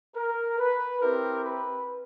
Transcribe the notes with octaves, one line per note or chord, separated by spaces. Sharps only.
A#4
B4
C4 E4 G4 A#4
B4